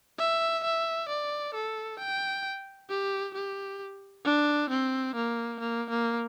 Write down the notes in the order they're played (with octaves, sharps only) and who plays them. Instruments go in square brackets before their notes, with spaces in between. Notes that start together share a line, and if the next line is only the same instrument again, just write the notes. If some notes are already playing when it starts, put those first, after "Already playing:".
[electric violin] E5
E5
D5
A4
G5
G4
G4
D4
C4
A#3
A#3
A#3